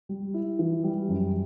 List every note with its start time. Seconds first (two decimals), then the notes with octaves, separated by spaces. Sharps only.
0.09 G3
0.34 E4
0.59 E3
0.84 G3
1.09 F#2